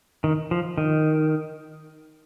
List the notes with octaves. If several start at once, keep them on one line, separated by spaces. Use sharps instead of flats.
D#3
F3
D#3